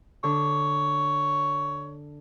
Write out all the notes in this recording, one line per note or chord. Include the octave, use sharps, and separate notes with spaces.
D3 C#5